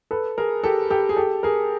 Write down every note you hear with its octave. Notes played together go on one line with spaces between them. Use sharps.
A4 B4
G#4 A#4
G4 A4
G4 A4
G#4
G4 A4
G#4 A#4